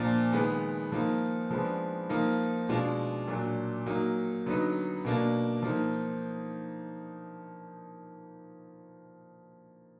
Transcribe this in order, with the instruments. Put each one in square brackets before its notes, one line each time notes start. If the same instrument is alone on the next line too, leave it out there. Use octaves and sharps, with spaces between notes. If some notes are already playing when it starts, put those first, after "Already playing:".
Already playing: [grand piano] A#2 F3 A#3 D4
D#3 G#3 B3
F3 A#3 D#4
F3 G#3 B3 D4
F3 A#3 D#4
B2 G#3 D4 F4
A#2 F#3 D4
F#3 A#3 D#4
D3 F#3 B3 D#4
B2 A#3 D4
F3 A#3 D#4